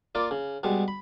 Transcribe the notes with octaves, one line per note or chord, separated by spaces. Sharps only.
A#3 F4 D5
C#3
B2 G3 G#3
B5